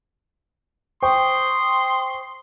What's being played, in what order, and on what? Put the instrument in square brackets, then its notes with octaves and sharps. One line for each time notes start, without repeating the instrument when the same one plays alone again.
[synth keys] C5 C#6 [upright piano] G5 [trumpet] C6 [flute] D#6